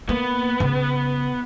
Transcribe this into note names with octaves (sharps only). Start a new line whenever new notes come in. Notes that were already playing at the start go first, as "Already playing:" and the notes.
A#3 B3
C#3